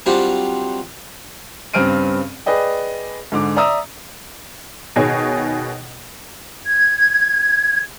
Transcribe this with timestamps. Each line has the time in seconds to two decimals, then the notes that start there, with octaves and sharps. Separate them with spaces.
0.06 F#3 G3 C4 D4 F4 G4
1.74 G2 C#3 C4 F6 D7 D#7
2.46 G#4 B4 D5 D#5 G5
3.32 G#2 D3 D6
3.57 D5 E5 A#5 D#6 E6
4.96 B2 D#3 G#4 C#5
6.66 G#6